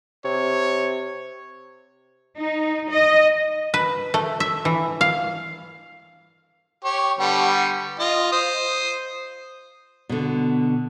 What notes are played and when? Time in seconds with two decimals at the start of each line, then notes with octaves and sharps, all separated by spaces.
0.25 C3 C#5
2.37 D#4
2.90 D#5
3.74 B4
4.14 A3
4.40 E5
4.65 E3
5.01 F5
6.84 G4 C#5
7.19 D3 G3 B3
7.99 F4 D#5
8.32 C5 D#6
10.09 B2 D3